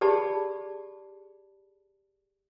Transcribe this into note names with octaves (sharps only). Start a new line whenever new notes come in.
G4 G#4 D5 A5 B5